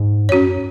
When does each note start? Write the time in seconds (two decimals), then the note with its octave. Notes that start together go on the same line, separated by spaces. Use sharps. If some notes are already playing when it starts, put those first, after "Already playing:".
Already playing: G#2
0.29 F#2 C#4 F#4 C#5